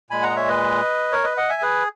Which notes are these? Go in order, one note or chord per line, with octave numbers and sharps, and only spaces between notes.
A#2 G#3 G#5 B5
F#5 A#5
D#5
C#5 E5
B4 D#5
A#4 C#5
B4 D#5
D#5 F#5
E5 G#5
G#4 B4